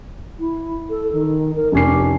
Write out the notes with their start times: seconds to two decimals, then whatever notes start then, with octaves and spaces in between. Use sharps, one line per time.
0.39 E4
0.90 A4
1.12 D#3
1.56 A#4
1.72 F1 C#4 G4 C7